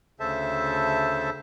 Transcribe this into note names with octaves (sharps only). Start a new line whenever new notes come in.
D2 C#3 A4 C5 E5 A5